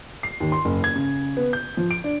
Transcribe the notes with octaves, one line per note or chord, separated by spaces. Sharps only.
C7
D#2
C6
F#1
G#6
C#3
B3
G6
F3
D7
D4